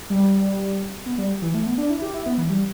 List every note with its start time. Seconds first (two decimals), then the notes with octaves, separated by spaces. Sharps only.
0.10 G3
1.06 B3
1.18 G3
1.42 E3
1.54 A3
1.66 B3
1.78 D4
1.90 E4
2.02 G4
2.14 E4
2.26 B3
2.38 E3
2.50 G3